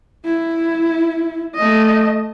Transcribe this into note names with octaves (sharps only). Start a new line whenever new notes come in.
E4
A3 D#5